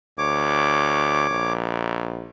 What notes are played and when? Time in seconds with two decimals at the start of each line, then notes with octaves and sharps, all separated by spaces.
0.18 D2 C#5 D6
1.31 A#1